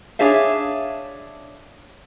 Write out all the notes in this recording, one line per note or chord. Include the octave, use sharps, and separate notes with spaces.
D4 G#4 C#5 E5 F5